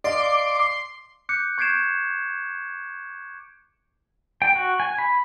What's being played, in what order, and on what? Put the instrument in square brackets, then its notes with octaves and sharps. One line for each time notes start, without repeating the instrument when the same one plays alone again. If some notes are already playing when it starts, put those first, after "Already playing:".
[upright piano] D5 D#5 F5 [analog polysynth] C6 C7 [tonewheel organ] D6
[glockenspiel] D6 F#6 G6 C#7
C#6 G6 G#6 C7 D7 E7
[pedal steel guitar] G5
F#4
G#5
B5